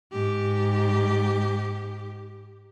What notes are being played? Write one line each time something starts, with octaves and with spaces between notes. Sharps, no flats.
G#2 G4